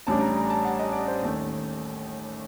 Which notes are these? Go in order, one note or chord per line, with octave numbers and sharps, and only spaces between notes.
A1 A2 G3 D4 A5
A#5
A#5
A5
F#5
D#5
D5
C5
D#2 D#3 A3